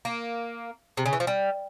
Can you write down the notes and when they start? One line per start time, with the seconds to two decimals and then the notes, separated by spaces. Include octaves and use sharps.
0.05 A#3
0.97 C3
1.06 C#3
1.13 E3
1.20 F3
1.27 G3